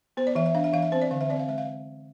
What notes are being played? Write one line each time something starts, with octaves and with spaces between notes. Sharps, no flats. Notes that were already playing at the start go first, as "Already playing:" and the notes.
B3 C5
D5
E3 E5
E5
D4 F5
E5
E3 F5
E5
C4 C5
D5
D3 F5
E5
C4 D5
F5
G#3 E5
F5